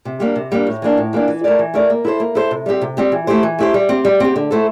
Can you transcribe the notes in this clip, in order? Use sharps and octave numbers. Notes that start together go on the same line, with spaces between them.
C3
G3 A#3 D4
C3
G3 A#3 D4
A2
E3 A#3 D4
A2
E3 A#3 D4
E3
A3 E4 A#4 D5
E3
A3 E4 A#4 D5
A#3
E4 A4 C5
A#3
E4 A4 C5
C3
G3 C4 G4
C3
G3 C4 G4
E3
A3 E4 G4 C5
E3
A3 E4 G4 C5
G3
C4 G4
G3
C4 G4
D3
A3 E4 A4 C5